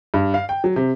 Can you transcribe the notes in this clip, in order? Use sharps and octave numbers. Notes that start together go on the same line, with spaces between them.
G2
F5
G5
F#3
C3